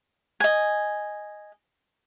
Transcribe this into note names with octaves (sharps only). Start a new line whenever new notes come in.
D#5 G#5